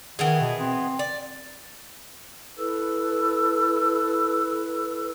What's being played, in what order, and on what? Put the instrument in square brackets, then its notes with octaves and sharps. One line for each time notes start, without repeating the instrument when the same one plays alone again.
[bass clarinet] D#3 [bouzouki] E3 B3 G#4
[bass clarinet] B2
C4
[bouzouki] D5
[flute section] E4 A4 B4 E6